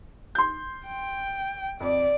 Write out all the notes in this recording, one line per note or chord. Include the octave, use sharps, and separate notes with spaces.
C6 G6
G5
F2 D5